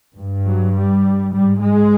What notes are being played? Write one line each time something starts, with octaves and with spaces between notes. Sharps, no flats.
G2
F#3
G3
G#2 G3
G#3